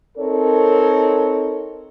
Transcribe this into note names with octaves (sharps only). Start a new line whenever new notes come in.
C4 D#4 A4 A#4 C#5